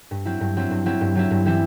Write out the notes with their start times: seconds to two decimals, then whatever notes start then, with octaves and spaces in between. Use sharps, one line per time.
0.11 G2
0.25 F#3 C4 E4
0.41 G2
0.56 F#3 C4 E4
0.71 G2
0.86 F#3 C4 E4
1.01 G2
1.15 F#3 C4 E4
1.31 G2
1.45 E3 G3 C4 E4